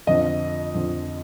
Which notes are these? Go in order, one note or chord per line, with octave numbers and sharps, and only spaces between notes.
F2 D3 F3 D#5
F2 D3 F3